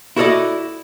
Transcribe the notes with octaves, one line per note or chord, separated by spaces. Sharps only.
E4 F#4 A4 A#4 D5 D#5